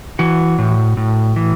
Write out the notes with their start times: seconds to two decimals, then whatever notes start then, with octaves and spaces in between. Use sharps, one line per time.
0.19 E3 F#4
0.58 A2
0.97 A2
1.36 E3